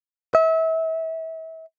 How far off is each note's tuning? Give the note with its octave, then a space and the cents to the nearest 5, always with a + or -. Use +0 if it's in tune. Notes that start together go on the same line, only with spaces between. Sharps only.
E5 -30